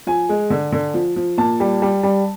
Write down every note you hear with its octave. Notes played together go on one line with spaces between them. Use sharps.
F3 G#5
G#3
D3
D3
F3
F3
A#2 A5
G3
G3
G3